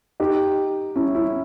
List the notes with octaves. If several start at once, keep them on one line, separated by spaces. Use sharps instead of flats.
D#4 G4
C#4 E4
C#4 E4